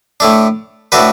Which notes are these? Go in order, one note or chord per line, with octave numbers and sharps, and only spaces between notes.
A2 A3 D4
A2 A3 D4 F#4 B4